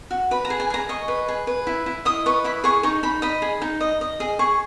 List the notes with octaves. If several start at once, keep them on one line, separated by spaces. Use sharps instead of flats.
F#4
B4 B5
A#5
G#4
G#5
G#4 A#5
D#5 C#6
B4
G#4
B4
E4
E4
D#5 D#6
B4 C#6
E4 B5
G#4 C#6
D#4 C#6
D#4 B5
D#5 B5
G#4
D#4
D#5
D#5
G#4
G#4 C#6